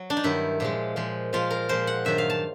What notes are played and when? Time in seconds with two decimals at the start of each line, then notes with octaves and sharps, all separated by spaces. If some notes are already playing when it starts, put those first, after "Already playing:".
Already playing: F#3
0.10 D4
0.17 D#4
0.24 G2 D#3 F#3 E4
0.60 A#2 F3 G#3
0.96 A#2 F3 G#3
1.33 A#2 F3 G#3 F4
1.51 A#4
1.69 A#2 F3 G#3 C5
1.87 F#5
2.05 G2 D#3 F#3 E5
2.18 F5
2.30 A5